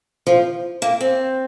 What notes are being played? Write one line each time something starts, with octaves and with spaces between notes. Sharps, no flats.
F3
A#3
C4